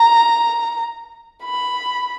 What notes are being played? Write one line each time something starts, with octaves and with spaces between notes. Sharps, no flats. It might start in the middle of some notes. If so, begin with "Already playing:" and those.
Already playing: A#5
B5